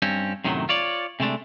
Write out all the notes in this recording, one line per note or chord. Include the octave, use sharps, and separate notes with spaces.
G2 C4 C#4
F#2 A2 C3 D#3 E3 F#3
F4 C#5 D5
C3 G#3 A3 D4